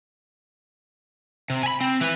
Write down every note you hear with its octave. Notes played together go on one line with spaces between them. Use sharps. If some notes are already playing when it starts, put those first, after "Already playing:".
C3
G#5 B5
C4
E3 B4